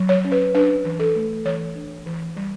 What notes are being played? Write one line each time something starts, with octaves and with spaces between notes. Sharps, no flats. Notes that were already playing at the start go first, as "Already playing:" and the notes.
Already playing: F#3
C#5
C#4
B4
D4 B4
E3
A4
A3
E3 C#5
D4
E3
G3